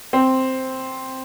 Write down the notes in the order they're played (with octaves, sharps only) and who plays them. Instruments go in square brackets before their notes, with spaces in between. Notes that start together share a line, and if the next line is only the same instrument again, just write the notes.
[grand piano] C4